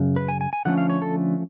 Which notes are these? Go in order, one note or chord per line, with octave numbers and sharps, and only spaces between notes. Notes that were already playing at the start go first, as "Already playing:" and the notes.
Already playing: F#2 C#3
B4
G#5
G#5
G#5
D3 F3 A3 C#4 F#5
F5
C#5
A4